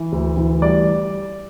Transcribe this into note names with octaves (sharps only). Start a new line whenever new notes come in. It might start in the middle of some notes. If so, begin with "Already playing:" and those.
Already playing: E3
D2
E3
G3 D5